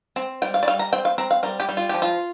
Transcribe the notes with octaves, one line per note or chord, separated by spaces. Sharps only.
C4
G3 G5
F5
D5
G3 F5
A#5
C4 G5
F5
C4 A#5
F5
G3 A#4
G4
G3
F4
F3 G4
F4